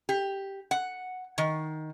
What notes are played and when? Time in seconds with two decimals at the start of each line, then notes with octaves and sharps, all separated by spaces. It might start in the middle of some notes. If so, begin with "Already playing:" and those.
0.09 G4
0.71 F#5
1.38 D#3